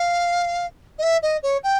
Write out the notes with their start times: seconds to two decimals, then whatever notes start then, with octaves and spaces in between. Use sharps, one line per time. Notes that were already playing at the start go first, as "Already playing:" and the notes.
Already playing: F5
0.98 D#5
1.02 E5
1.22 D#5
1.42 C#5
1.63 G5